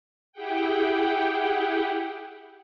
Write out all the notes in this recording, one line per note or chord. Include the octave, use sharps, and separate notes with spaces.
E4 G4 G#4 F#5 G5